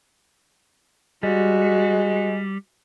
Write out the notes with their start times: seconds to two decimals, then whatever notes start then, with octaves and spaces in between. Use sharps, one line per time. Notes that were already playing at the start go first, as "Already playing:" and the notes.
1.23 G3 G#3 F#4